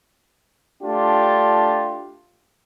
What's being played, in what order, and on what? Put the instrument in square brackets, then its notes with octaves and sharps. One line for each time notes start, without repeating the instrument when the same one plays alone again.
[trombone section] A3 D4 F4 G4